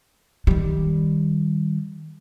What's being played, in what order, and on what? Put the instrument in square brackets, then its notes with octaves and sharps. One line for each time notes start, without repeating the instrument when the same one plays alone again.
[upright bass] D#3 G3